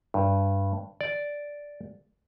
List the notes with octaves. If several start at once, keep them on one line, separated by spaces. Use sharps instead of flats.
G2
D5